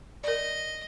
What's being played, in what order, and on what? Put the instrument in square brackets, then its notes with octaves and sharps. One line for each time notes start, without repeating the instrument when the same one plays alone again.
[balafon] A#4 D5 [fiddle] D#5